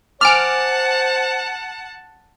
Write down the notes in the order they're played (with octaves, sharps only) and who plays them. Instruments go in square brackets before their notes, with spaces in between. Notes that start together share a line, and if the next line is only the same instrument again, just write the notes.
[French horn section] C5 [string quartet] F#5 A5 [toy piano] G#5 D6 [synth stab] F6 D7